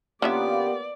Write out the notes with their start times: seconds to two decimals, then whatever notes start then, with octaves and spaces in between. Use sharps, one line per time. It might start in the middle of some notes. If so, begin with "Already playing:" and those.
0.22 D3 A#3 B3 C#4 F4 G4 D5 E5